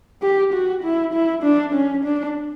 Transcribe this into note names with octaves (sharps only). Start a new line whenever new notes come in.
G4
F#4
E4
E4
D4
C#4
D4